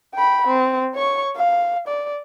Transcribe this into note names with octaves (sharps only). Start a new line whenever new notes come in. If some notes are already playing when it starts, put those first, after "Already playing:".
G5 B5
C4
C#5 C#6
F5
D5